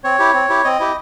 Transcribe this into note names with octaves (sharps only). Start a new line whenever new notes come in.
C4 C#5
E4 G4
C4
E4 G4
C4 D#5
E4 G4